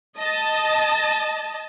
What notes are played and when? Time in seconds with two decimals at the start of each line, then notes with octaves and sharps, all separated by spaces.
0.17 D#5 A5